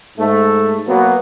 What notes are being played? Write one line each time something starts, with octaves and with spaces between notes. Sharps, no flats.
G#2 A3
B2 F#3 A#3 B3